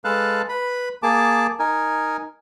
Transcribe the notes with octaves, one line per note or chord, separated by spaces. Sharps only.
G#3 A4 B4 F5 A5 F#6
B4 B5
A#3 G#4 A5 D6
D#4 A#4 G#5